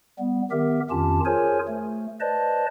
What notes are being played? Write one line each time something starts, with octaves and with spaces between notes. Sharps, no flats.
G3 B3
D#3 B3 G4 A#4 E5
F2 D#3 C#4 F4 G4 A5
F4 G#4 A#4 C5 C#5 G#5
A3
B4 C5 D5 D#5 A5